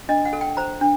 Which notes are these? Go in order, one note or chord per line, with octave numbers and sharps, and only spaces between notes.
D4 D#5
F#5
A4
G5
C5 A#5
D4